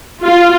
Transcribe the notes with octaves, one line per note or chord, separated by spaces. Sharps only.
F4